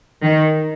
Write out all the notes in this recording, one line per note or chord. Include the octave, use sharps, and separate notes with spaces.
D#3